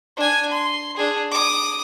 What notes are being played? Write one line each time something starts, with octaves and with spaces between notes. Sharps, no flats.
D4 G#5
C6
D4 G#4
D6 D#6